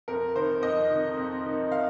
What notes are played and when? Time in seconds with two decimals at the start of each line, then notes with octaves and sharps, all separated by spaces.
0.08 F2 A#4
0.36 D#3 C5
0.62 F2 D#5
0.90 D#3
1.17 F2
1.45 D#3
1.72 F5